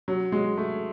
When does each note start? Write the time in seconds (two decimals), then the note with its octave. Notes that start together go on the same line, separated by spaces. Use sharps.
0.08 F#3
0.32 G#3
0.58 A3